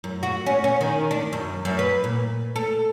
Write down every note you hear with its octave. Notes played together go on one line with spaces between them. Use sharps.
F#2
F#4
C#4
C#4
D#3
D4
F#2
F#2
B4
A#2
A4